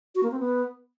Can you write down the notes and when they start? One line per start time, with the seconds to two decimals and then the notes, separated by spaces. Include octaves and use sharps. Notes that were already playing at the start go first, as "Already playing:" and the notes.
0.15 F#4
0.23 A#3
0.31 C4
0.40 B3